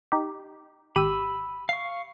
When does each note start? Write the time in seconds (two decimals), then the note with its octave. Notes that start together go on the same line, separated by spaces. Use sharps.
0.12 D#4 G4
0.96 G#1 G4 B5 E6 D#7
1.69 F5 C#6 C7